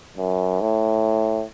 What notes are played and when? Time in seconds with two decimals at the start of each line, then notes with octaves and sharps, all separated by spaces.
0.17 F#2
0.61 A2